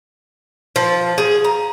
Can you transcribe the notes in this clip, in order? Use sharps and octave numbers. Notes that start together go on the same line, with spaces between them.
F3
G#4
A#5